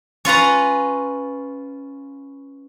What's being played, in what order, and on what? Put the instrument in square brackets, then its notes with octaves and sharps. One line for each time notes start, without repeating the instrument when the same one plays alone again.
[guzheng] C#4 F4 B4 A#5